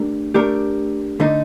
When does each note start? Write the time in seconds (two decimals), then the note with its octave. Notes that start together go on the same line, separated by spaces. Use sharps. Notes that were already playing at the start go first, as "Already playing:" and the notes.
Already playing: A3 D4 G4 A#4
0.34 A3 D4 G4 A#4
1.20 D3 A3 D#4